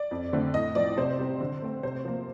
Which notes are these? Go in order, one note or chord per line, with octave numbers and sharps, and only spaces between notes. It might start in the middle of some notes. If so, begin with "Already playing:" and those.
Already playing: D5
F2
D3 A3 C4
A2 D#5
F3 C4 D5
C3 C5
G3 C4
D3
A3 C4
C3 C5
F3 A#3